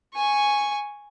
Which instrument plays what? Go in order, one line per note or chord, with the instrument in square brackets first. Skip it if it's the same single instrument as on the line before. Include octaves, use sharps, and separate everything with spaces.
[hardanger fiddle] G#5 C#6